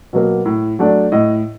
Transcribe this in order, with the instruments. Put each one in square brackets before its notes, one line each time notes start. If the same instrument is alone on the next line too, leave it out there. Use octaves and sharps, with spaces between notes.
[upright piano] B2 F#3 A#3
A2
F#3 A3 D4
A2 D#5